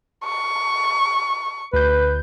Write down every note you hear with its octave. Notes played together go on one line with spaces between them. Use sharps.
C#6
D2 B4 G6